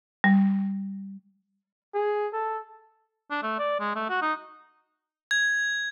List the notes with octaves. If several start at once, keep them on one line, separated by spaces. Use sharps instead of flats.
G3
G#4
A4
D4
A3
D5
G#3
A3
F#4
D#4
G#6